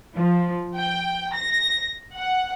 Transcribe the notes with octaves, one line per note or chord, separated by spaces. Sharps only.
F3
G5
A#6
F#5